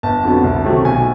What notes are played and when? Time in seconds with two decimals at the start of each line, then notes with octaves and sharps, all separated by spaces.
0.03 G1 A5
0.24 F2 D3 F#3 B3
0.44 C2
0.65 C3 D#3 F#3 A3
0.84 B1 G#5